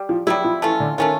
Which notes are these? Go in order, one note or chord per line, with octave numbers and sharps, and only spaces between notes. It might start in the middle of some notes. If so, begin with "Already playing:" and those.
Already playing: G3
F3
F#3 G3 B3 E4
F3
E3 A3 C#4 F4
D3
D#3 A3 C#4 F4